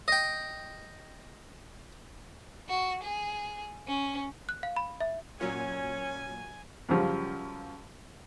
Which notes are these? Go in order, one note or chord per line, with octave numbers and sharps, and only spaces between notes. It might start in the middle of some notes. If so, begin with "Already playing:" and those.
D#5 G5
F#4
G#4
C#4
F#6
F5
B5
E5
A#2 F#3 C#4 G#5
F#2 C#3 F3 G3